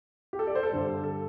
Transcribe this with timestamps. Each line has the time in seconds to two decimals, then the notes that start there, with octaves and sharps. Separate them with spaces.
0.33 G4
0.39 A4
0.47 D5
0.55 C5
0.63 A4
0.72 G2 D3 G3
1.04 A4